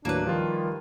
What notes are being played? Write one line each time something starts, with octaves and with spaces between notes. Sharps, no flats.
D#2 A2 F#3 A#3 D4 B4
D#3 F3 G3 F4